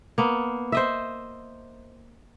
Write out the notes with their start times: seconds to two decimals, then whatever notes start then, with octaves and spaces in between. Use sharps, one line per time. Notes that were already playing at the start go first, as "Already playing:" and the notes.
0.18 A#3 B3
0.72 C5 D#5 E5